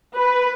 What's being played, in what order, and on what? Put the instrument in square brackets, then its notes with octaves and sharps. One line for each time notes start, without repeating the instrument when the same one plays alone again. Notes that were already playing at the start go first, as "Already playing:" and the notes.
[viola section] B4